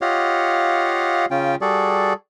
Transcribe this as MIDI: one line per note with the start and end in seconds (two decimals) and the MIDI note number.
0.01 1.25 65
0.01 1.25 67
0.01 1.25 73
0.01 1.25 75
0.01 1.25 77
0.01 1.25 78
1.31 1.55 49
1.31 1.55 61
1.31 1.55 65
1.31 1.55 79
1.61 2.13 55
1.61 2.13 66
1.61 2.13 68
1.61 2.13 69
1.61 2.13 74